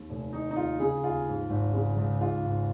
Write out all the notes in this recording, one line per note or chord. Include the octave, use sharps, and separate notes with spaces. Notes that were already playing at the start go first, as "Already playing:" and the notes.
Already playing: D#2
F1
D#3 D#4
D#4
D#2 F4
C#3 G#4
D#2 F4
G#2
G#1
C#3
C#2
G#2 F4
G#1